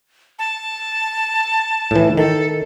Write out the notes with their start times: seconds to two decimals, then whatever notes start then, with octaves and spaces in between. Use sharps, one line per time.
0.39 A5
1.91 A2 E3
2.17 D#3 A4